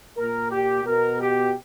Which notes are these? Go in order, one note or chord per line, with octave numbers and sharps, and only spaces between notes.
A#2 A#4
G4
B2 A#4
G4